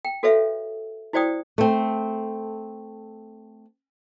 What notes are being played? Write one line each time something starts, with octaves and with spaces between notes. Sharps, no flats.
G5
F#4 A4 B4 C#5 E5 F5
E4 F#4 C5 D5 G5 D#6
A3 C4